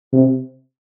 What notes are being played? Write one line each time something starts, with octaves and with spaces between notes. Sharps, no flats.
C3